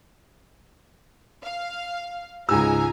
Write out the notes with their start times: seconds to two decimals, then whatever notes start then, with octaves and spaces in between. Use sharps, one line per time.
1.43 F5
2.49 C#2 G#2 G#5 A#5 E6